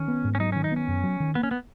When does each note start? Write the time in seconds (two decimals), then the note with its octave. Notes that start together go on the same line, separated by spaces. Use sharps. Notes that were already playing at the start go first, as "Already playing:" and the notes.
Already playing: D#3 C#4
0.08 B3
0.24 G#2
0.35 C#4
0.40 F#3 D#4
0.52 D#3 C#4
0.64 D#4
0.72 B3 C#4
0.88 F#2
1.03 F#3
1.20 D#3
1.35 A#3 B3
1.43 C#4
1.51 B3